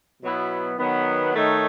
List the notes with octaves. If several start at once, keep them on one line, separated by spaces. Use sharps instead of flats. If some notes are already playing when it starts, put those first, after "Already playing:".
B2 F#3 B3 E4
D#3 F#3 B3
D#3 A3 D#4 A4 C#5